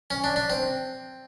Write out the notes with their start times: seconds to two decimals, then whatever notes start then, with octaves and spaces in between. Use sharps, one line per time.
0.11 C#4
0.24 D4
0.36 D4
0.50 C4